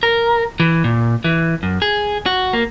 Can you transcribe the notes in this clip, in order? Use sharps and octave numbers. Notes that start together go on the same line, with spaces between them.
A#4
E3
A#2
E3
F#2
G#4
F#4
A#3